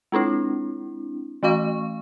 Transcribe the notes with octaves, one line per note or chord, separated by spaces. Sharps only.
G#3 C4 D4 E4
E3 A3 F#4 F5 C#6